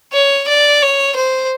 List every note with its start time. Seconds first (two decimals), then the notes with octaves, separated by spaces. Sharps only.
0.13 C#5
0.48 D5
0.82 C#5
1.16 C5